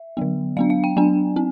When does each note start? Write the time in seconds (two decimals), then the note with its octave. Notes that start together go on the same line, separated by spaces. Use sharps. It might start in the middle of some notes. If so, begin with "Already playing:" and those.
Already playing: E5
0.17 D3 F#3 B3
0.57 F#3 B3 D4 F5
0.70 F5
0.84 G5
0.97 F#3 B3 D4 G#5
1.36 C4